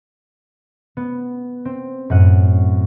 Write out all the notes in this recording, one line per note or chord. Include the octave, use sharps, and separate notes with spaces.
B3
C4
F#2 A2 F#5 D#7